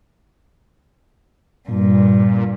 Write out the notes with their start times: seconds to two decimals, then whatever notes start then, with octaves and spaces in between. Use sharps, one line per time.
1.68 G2 A#2